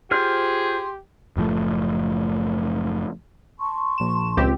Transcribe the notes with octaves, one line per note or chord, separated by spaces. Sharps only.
F4 G4 G#4 C5 C6 F6
F#1 A2 F3 A3
A5 C6 C#6
A#1 E7
C#2 C4 G4